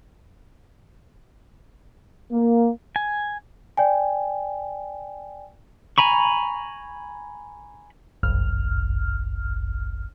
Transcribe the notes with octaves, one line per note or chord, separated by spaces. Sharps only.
A#3
G#5
D5 G5 G#5
G#5 A#5 B5 C#6
G1 C2 F#2 F6